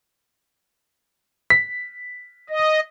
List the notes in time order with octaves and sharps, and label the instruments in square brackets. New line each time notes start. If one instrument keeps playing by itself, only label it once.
[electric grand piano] B6
[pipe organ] D#5